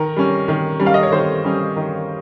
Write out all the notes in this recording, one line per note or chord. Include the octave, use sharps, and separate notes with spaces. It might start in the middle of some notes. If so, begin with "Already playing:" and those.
Already playing: D#3 A#4
G3 C#4
D#3
G3 C#4
F5
D#5
C#5
D#3 C5
G3 C#4
D#3